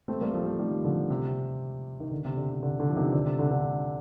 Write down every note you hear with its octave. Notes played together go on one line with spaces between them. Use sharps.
A3 C4
G3 A#3
F3 A3
A3 C4
D#3 G3
D3 F3
C3
C3
D#3
D3
C3
D3
C3
D3
D3
F3
C3 D#3
D3
C3
D3
D3